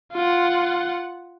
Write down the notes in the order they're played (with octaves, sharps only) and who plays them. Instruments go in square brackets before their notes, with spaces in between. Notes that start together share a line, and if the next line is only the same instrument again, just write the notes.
[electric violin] F4 F#5